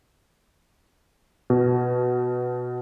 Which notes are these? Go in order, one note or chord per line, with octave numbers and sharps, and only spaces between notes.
B2